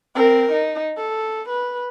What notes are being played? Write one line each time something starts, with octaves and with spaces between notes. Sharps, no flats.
C4 A#4
D#4
A4
B4